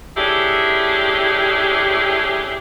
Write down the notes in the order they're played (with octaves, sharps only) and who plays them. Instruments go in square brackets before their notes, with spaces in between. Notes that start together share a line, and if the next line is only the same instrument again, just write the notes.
[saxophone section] A3 C#4 D4 E4 G4 G#4